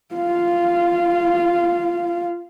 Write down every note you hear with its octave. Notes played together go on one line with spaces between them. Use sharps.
F4 F5